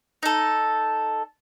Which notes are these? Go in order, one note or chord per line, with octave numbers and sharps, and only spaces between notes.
D#4 A4